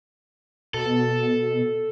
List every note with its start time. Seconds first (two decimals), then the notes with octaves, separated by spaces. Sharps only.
0.74 B2 A4